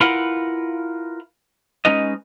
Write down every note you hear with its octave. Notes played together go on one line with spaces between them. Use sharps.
E4 F4 A#4 B4 F5 F#5
G#3 C#4 D#4 B4 D#5